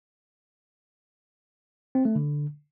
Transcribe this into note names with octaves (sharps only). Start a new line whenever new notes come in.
C4
A3
D3